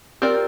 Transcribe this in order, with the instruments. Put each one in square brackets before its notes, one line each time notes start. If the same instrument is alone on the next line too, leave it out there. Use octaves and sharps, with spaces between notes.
[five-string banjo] C4 F4 A#4 D5 [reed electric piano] G4